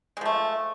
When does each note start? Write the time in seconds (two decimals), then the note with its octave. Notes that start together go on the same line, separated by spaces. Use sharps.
0.17 G#3
0.21 F3
0.25 A3